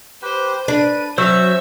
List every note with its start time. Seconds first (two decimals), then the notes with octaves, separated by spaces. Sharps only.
0.22 G4 B4 C5 G5
0.68 D4 B4 D#7
1.18 F#3 C#4 C5 C#5 E5 E6